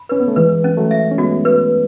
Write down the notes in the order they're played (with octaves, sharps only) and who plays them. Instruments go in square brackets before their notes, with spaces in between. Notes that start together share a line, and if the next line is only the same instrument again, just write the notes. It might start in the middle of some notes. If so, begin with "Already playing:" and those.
Already playing: [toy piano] B5
[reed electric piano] C#4 [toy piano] B4
[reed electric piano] B3
A3
[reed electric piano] E3 G#3 [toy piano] B4
[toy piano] C#4
[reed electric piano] F#3 A3
[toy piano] E5
[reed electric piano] C#4
[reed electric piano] G#3 B3 [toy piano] F#4
[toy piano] B4